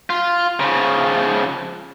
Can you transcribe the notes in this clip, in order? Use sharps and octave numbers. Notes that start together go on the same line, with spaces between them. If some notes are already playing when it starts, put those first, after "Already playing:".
F4
C#3 F3